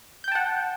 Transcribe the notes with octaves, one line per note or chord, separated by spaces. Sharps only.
F#5 G5 A5 G6